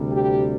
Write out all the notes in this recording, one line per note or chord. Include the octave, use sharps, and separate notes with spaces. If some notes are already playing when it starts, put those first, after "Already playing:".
Already playing: D2 C3 G3
G4